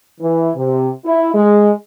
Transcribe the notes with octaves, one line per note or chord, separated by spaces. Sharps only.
E3
C3
E4
G#3